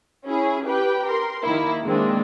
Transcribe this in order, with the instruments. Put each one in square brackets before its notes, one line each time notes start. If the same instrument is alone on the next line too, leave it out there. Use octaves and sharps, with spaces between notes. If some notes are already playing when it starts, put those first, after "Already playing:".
[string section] C#4 E4 G#4
G4 B4 G5
A#4 C6
D#3 A#3 E4
D#3 G#3 A#3 C4 D4